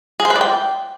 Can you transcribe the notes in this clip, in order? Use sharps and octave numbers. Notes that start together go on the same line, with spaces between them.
G#4
C5
B4
D5
G5